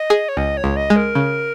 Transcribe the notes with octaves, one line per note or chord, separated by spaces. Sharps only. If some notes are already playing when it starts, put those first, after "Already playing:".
Already playing: D#5
G#4
C#5
C#2 D#5
C#5
C#2
D#5
G#3
A#4
C#3